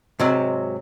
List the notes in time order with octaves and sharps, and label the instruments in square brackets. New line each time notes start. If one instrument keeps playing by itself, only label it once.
[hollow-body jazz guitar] G#2 C3 F#3